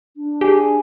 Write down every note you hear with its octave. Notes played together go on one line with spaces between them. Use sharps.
D4
G4 G#4